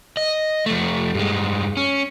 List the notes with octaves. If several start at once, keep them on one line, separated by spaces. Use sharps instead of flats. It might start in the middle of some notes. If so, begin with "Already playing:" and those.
D#5
F2 A3
G2 G#3
C#4